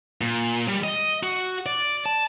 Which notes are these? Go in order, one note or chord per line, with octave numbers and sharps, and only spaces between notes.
A#2
G3
D#5
F#4
D5
A5